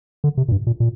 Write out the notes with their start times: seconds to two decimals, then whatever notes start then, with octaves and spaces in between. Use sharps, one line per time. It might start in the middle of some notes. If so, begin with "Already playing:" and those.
0.24 D3
0.38 C3
0.48 A#2
0.52 G2
0.67 A#2
0.80 A#2